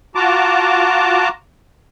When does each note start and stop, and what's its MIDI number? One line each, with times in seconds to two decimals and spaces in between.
0.15 1.29 65
0.15 1.29 66
0.15 1.29 81
0.15 1.29 82
0.15 1.29 86